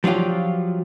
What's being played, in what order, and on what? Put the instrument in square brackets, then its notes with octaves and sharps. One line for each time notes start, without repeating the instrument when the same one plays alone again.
[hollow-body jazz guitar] F3 F#3 D4 F4 G4